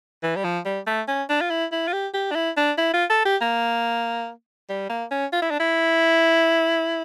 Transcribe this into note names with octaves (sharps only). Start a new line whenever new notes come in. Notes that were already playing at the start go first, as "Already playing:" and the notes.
E3
G3
F3
G3
A3
C#4
D4
F4
E4
E4
F4
G4
G4
D4
E4
D4
E4
F4
A4
G4
A#3
G3
A#3
C#4
F4
E4
D4
E4